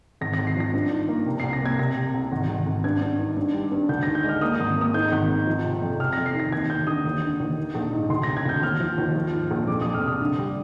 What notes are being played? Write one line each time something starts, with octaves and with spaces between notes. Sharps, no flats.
G#1 A#6
G#1 A#6
C7
F3 A#6
G2
D#3
A#3
C3
C2 C7
A#6
A#3 G#6
C3 A#6
C3
C2
G#1
G#1
G#1
G2 G#6
G2
D#3
G2
G3
G2
D2 G6
D#3 A#6
G6
G#3 F6
A#3 D#6
D#6
G#1
A#3 D#6
G#2 G6
G#1
G#1
F3
C3
F2
C3 F6
F2 A#6
C7
D#3 A#6
D#2 G#6
D#2 G6
D3 D#6
D#2
D3
D#2
D#3
A#1
G#2
D2 C6
C3 A#6
G#6
D2 G6
D#2 F6
F3
D#2
F3
G#2
A#1
F2 D6
F2 D#6
F6
C3 D#6
D3
G3